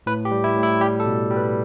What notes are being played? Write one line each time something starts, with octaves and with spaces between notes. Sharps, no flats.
A2 B4
G4
G3
E4
A2
E4
G3 G4
A4
B2
G3
B4